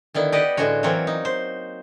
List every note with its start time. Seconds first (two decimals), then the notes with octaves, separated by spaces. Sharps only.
0.14 D3 D#3 B3 E4
0.32 G4 B4 D5 D#5 F#5
0.57 A2 D3 G#3 F#4 C#5
0.83 E3 F#3 A#3 C4 C#5
1.07 D#4
1.25 C5